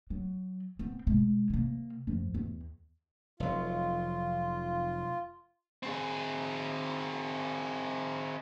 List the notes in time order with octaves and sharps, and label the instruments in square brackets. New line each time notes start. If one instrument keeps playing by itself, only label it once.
[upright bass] F#3
B3 C4
B2 G#3
C3 A#3
F#2 F3
E2
[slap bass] F1 F#3 [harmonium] F4
[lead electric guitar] C4 G#4